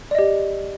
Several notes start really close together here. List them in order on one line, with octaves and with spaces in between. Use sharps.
D5 D#5 G4